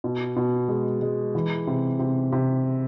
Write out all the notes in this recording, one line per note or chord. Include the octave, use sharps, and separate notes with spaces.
B2
B2
G#3
G#3
E3
C3
C3
C3